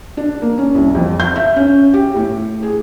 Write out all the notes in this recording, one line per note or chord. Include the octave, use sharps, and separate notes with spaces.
D4
A#3
C#4
C2
F2
G6
E5
C#4
G4
A2
G#4